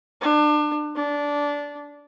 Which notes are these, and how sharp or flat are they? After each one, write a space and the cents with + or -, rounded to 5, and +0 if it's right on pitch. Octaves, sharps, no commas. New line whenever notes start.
D4 +30
D4 -15